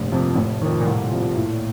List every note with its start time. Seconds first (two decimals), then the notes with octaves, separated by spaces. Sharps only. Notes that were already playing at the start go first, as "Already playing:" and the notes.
Already playing: F1 G2 A#2
0.12 F2 C3 F3
0.35 F1 A2
0.61 F2 D#3
0.81 A#2
0.85 C2 A2
1.10 C3 F3
1.36 A2